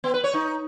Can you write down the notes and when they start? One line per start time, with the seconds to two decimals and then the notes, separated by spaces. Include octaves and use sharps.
0.04 B3
0.14 B4
0.24 C#5
0.34 D#4